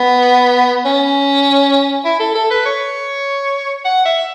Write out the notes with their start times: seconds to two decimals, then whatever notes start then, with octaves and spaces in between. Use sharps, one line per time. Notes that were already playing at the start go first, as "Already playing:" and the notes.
Already playing: B3
0.85 C#4
2.05 E4
2.20 A4
2.35 A4
2.51 B4
2.66 C#5
3.85 F#5
4.05 E5